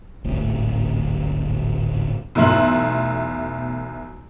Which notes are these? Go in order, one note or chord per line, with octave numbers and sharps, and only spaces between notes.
D1 G#1 A2
B1 E2 A3 C6 F#7